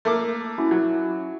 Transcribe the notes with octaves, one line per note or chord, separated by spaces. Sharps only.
A3 A#3 D6
C#4 E4 F#4
F#3